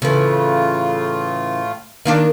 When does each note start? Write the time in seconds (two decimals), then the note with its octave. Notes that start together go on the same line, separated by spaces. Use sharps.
0.02 A2 C#3 E3 A3 F4
2.05 D#3 A#3 D4